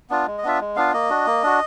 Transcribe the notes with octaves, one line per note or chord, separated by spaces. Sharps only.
B3 D4 F4
G#3
D#5
B3 D4 F4 E5
G#3
B3 D4 F4 F5
A#3 D#5
D4 F#4
A#3
D4 F#4